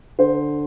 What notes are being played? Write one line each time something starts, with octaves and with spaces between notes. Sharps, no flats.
D3 C5